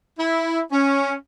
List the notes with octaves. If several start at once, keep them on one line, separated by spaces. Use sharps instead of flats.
E4
C#4